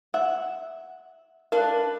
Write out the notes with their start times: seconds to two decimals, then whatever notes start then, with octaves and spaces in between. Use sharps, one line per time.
0.14 E5 F#5
1.52 D4 A#4 B4 F5